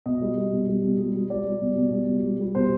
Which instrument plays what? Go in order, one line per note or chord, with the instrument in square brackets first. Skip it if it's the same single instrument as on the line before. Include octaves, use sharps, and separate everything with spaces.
[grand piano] B2 D#5
G3
G3
B2
G3
B2
G3
G3
G3 D5
G3
B2
B2
G3
B2
G3
G3
B2 C5